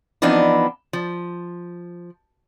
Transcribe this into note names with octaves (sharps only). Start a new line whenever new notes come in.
E3 F3 B3 C4 D4 D#4
F3